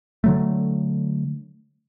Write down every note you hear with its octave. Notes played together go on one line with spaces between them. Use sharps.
D3 F#3 A3